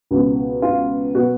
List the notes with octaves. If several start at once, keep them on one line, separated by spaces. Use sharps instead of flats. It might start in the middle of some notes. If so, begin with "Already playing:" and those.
C#2 B2
F4
B2 F#4